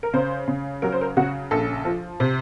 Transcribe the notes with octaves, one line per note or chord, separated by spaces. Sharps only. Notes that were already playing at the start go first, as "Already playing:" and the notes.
A#4
C#3 C5
C#3
F#3 A#4
C5
A#4
C#3 F#4
A#1 A4
F3
C3